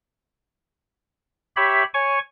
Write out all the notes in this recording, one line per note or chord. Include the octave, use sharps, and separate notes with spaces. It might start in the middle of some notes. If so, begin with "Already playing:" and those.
G4 C#5 E5 B5
C#5 G#5 C#6